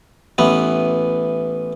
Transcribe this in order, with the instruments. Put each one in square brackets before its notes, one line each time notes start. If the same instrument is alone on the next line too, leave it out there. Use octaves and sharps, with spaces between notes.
[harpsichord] A1 E3 B3